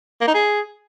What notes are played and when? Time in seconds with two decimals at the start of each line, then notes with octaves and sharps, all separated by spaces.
0.21 A#3
0.28 D#4
0.35 G#4